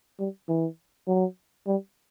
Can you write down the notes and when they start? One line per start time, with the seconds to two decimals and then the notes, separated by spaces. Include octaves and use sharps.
0.19 G3
0.48 E3
1.07 F#3
1.67 G3